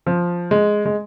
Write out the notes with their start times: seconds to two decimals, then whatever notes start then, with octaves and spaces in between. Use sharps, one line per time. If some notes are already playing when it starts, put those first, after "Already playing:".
0.06 F3
0.51 G#3
0.85 G#3